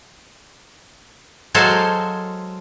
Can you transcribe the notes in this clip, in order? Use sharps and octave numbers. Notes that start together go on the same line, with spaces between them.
F#3 G#3 A4 C5 F5